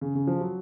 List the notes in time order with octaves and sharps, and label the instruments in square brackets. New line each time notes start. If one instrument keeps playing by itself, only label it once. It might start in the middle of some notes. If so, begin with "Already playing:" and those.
[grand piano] C#3
C#3
F3
F#3